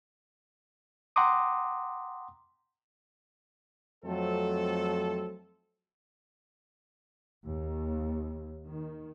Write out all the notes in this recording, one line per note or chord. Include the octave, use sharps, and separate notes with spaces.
F#5 G5 A#5 C6 D6 D#6
F2 F#3 A3 C4 A4
D#2
D#3